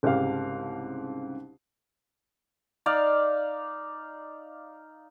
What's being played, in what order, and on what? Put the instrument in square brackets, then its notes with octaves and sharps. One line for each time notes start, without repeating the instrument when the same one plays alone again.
[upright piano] C2 G#2 C#3 D#4 G4 F5
[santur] D#4 D5 F5